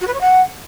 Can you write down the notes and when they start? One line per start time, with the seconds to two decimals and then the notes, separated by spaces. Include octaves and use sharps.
0.01 F#4
0.07 B4
0.14 C#5
0.21 F#5